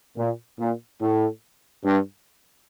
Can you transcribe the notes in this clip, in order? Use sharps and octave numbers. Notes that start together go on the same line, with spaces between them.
A#2
A#2
A2
G2